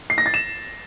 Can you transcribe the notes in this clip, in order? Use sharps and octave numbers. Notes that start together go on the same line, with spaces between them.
C7
A#6
A6
E7